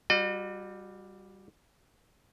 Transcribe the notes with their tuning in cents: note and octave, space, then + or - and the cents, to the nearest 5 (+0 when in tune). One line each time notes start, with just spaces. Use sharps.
G3 +0 F#4 -35 D#5 -45